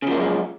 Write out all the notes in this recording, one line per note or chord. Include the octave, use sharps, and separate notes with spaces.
F#2 C#3 F3 G#3 A#3